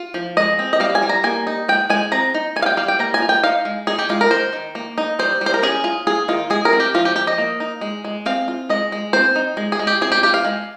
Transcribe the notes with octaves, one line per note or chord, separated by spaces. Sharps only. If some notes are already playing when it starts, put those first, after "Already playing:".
Already playing: F4
F3
G#3 D#5
C4
D#5
G3 F5
G#5
G3
A#5
A#3 G#5
D#4
G#3 G5
G#3 G#5
C4 A#5
D#4
G3 G#5
F5
G5
G3 F5
G5
A#3 A#5
G#5
F4
G5
D#4 F5
G#3
D#4 G#4
G4
G#3 F4
A#4
D#3 C5
D#3
A#3
D#4
G3 C5
G3
C5
A#4
C#4 G#4
F4
F4 G#4
D#3 F4
G#3 G#4
A#4
C4
G4
F3 F4
G4
F3 G4
D#5
A#3
D#4
G#3
G#3
C4 F5
F4
G#3 D#5
G#3
C4 C5
D#4
G#3
G#4
G#3
G4
C4 G#4
G4
F4 G4
F5
G#3